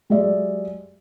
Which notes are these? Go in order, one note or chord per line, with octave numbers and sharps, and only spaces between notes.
F#3 G#3 G4 D5 E5